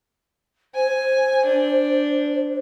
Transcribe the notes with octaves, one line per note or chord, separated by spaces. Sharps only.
C5 G#5
D4